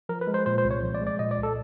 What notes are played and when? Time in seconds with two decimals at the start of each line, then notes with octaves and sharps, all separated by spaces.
0.09 F3 A#4
0.21 B4
0.27 G#3
0.34 C5
0.46 A#2 C5
0.58 C5
0.64 C2
0.71 C#5
0.82 F3
0.95 D5
1.01 G#3
1.07 D5
1.19 A#2 D#5
1.31 D5
1.38 C2
1.43 A4